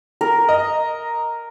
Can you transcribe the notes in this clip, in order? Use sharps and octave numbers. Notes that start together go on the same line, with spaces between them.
A#4
D#5